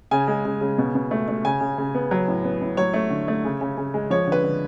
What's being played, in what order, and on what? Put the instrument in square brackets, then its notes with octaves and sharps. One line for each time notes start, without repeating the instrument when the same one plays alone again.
[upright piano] C#3 G#5
G#3
C#3
C#3
B2
B2
A3
A3
C#3 G#5
C#3
C#3
B3
F#3
A2
B3
A2
F#3 C#5
A3
D3
A3
C#3
C#3
C#3
G#3
F3 C#5
D3
B4
D3